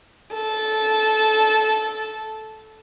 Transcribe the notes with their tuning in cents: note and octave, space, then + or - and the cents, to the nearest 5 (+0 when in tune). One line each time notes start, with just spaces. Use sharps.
A4 -15